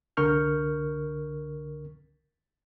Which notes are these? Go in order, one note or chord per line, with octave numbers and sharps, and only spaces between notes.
C2 D3 A#4 C#6 F6 G6